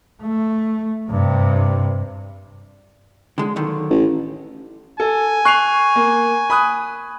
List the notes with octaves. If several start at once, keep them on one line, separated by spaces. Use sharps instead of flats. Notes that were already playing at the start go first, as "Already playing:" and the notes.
A3
G2 C3
D3 G#3
B1 D3 D#3
A1
A4 G#5
C#6 F#6 C7 F7
A#3
B5 D#6 F#6